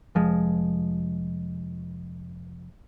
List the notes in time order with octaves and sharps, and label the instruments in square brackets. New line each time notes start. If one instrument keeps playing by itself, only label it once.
[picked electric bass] F1 F3 G#3